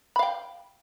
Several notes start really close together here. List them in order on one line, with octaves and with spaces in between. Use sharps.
B5 F5 G5